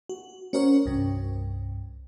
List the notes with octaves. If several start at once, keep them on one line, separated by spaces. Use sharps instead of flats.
F#4
C#4 F#4 A#4 C5 C#5
C2 G2